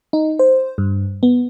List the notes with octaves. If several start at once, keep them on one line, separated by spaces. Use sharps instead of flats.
D#4
C5
G2
B3